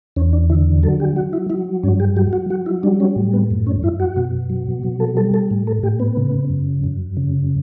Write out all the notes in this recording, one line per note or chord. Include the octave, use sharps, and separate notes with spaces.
E2 C#4
D4
D3 E4
F#3 A4
G4
F#3 F#4
E4
F#3 E4
G2 C#4
G4
F#3 G4
F#4
F#3 F#4
E4
G3 D4
C#4
A2
B3
F#2
C#4
F#2 E4
F#4
B2
F#3
B2
A4
G3 A4
A4
A2
A4
A2 G4
B3
C#3
F#2
F#2
C#3